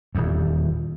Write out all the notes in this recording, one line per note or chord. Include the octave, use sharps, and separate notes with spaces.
D#1 E2